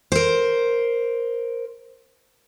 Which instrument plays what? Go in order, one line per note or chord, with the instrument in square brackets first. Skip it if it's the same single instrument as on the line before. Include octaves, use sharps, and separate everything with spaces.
[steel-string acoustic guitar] A#4 C5